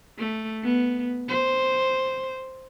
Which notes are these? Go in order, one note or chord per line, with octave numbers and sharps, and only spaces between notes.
A3
B3
C5